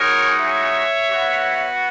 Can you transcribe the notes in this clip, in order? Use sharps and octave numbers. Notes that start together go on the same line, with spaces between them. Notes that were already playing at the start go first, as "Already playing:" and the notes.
Already playing: G#3 D#4 F#4 A#4 C#5
C#5 E5
B3 F#4